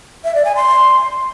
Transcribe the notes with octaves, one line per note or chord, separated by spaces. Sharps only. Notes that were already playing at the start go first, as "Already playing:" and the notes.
E5
D5
G#5
C6